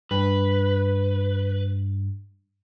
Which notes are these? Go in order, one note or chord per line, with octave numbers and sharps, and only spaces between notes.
G2 B4